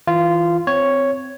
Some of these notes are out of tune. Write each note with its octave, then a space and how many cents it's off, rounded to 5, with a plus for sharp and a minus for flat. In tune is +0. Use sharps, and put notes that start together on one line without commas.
E3 -20 F4 -15
C4 -15 C#5 +0